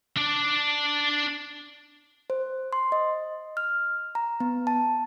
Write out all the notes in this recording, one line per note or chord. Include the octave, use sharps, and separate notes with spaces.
D4 D5
C5
C6
D#5
F6
A#5
B3
A5